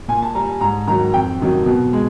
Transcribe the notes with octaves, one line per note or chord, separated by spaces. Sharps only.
A#2 G#5
A5
G3 A#5
G#2 A#5
D#3 F#3 A#5
F2 G5
C3 D#3 F#3
B2
G#3